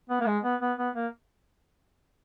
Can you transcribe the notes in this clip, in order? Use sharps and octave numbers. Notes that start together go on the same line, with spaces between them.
B3
A#3
G#3
B3
B3
B3
A#3